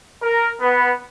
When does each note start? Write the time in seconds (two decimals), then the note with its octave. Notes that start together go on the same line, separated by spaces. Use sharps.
0.22 A#4
0.61 B3